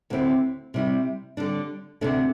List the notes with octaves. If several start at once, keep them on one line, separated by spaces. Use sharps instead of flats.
D2 D3 C4 E4
C3 G3 E4
D3 G3 D4
D2 C3 A3 D4